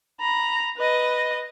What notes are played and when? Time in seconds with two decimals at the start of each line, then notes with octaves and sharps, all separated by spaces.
0.21 A#5 B5
0.77 B4 D#5